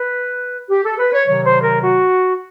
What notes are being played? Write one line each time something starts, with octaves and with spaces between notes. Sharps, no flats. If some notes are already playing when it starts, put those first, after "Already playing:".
Already playing: B4
G4
A4
B4
C#5
C3 D#3 F#3 C#5
C5
A#4
F#4